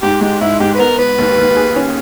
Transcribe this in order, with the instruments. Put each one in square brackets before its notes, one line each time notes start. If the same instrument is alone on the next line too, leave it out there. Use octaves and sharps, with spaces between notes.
[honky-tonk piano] G#2 [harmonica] G4
[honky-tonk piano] G#3 [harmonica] G4
[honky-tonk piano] G#2 [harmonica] E4
[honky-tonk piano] G#2 [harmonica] G4
[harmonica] B4
[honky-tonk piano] B3 [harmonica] A#4
[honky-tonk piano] B3 [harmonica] B4
[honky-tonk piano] D#2
D#2
G#4
C#4